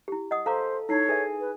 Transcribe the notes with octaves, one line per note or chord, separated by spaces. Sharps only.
E4 G4
D#5 F#5 D#6
A4 C5 F5 A#5 D6
D#4 E4 A4 C#5 C7
G#4 B4 E5 G#5
B4